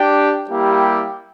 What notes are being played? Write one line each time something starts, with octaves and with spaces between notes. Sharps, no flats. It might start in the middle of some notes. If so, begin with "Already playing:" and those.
Already playing: D4 G4 D5 G5
G3 A#3 E4 G4